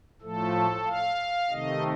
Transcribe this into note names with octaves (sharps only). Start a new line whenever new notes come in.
A2 F3 A3 A4
F5
C3 D#3 A3 D#5